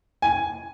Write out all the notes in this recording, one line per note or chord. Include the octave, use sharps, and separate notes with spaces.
G#5